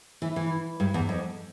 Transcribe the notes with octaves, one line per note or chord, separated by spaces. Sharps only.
E3
E3
G2
E2
F2